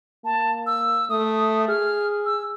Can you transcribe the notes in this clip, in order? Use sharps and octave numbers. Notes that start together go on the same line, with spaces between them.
A#3 A5
E6
A3 D#6
G#4 F6
E6